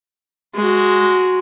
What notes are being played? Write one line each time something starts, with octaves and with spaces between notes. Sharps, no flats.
G#3 F#4